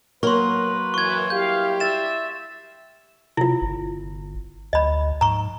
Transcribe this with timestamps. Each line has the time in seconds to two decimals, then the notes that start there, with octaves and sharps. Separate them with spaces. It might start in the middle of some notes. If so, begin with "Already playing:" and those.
0.23 F#3 A#3 A#4 B4 C6 C#6
0.94 F#2 E3 C#6 G#6
1.30 G3 E4 G4 F5 G6
1.80 E5 A6 E7
3.37 C3 E4 F4
3.61 G1
4.73 D2 D#5 B5
5.21 G#2 A#5 C#6